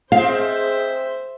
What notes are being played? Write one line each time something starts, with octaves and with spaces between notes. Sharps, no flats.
G#3 C4 C5 E5 F5